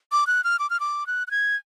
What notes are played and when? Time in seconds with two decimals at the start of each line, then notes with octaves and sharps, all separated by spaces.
0.12 D6
0.27 F#6
0.44 F6
0.59 D6
0.70 F6
0.80 D6
1.07 F#6
1.27 F#6
1.31 G#6